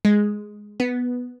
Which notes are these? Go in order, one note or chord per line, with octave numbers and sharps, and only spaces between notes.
G#3
B3